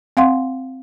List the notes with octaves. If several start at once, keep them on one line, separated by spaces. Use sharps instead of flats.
C4 F5 F#5 C6